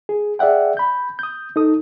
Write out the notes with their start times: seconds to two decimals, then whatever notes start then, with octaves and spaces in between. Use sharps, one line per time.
0.09 G#4
0.39 G#4 D5 E5 F#5 G5
0.77 B5 G6
1.19 D#6 G6
1.56 D#4 A4 D#6